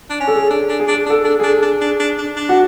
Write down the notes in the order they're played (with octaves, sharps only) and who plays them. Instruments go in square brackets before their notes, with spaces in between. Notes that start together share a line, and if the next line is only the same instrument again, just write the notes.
[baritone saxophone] D4
C#4
[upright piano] A4
G#4
[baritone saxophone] D4
D4
[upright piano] G#4
[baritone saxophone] D4
[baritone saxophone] D4 [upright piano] A4
[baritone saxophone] D4
[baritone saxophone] D4 [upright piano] G#4
[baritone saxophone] D4
D4
D4
D4
D4
[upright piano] F#4